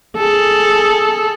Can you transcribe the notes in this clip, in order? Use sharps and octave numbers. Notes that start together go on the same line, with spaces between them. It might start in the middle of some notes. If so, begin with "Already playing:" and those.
G#4 A4